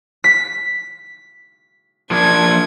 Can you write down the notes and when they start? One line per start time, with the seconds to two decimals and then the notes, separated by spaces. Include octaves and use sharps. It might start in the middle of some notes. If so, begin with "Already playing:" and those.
0.24 B6
2.11 F3 A#3 D4 G#6